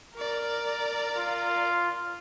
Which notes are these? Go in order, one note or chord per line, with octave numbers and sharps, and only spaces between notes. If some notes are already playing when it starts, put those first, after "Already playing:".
A#4 D5
F4